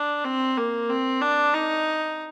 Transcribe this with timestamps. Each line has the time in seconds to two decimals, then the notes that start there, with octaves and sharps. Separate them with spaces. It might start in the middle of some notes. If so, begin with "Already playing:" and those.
Already playing: D4
0.24 C4
0.57 A#3
0.89 C4
1.20 D4
1.53 D#4